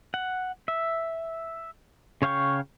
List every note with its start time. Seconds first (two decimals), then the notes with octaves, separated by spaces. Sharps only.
0.14 F#5
0.68 E5
2.22 C#3 C#5 F5 G5 C#6